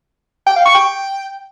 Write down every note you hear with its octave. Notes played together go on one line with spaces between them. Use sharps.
G5
F5
C#6
G5